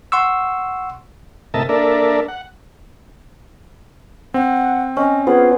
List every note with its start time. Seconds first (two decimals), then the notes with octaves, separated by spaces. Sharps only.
0.12 F#5 C6 C#6 E6
1.54 A2 C3 A#4 D#5 E5 A5
1.69 A#3 D4 A4 A#4 D5 E5
2.28 F#5
4.34 C4 F#5
4.97 C#4 D#5
5.27 B3 F4 G#4 C5